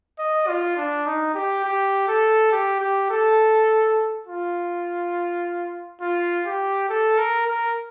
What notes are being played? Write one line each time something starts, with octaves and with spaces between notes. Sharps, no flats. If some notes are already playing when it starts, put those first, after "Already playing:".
D#5
F4
D4
D#4
G4
G4
A4
G4
G4
A4
F4
F4
G4
A4
A#4
A#4